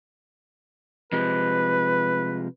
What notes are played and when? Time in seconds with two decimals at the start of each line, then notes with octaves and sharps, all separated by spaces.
1.12 C3 F3 G#3 B4